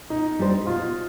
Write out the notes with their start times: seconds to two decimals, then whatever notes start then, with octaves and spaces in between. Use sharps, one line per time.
0.10 B2 D#4
0.39 G3 D4 G4 C5
0.67 B2 F4